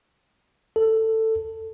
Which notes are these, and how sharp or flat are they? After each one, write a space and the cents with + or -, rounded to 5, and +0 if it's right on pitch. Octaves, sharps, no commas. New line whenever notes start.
A4 +15